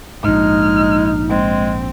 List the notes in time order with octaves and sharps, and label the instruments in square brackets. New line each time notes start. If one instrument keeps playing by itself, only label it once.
[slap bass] A#1 G#2 [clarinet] G#3 [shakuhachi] D#4 [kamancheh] F6
[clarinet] G#3 [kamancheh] C4